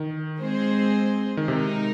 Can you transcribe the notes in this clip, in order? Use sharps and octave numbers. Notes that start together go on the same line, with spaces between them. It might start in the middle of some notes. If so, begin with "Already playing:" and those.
Already playing: D#3
G#3 C4 G#4 C5
D#3
C3 G#3 D#4 A#4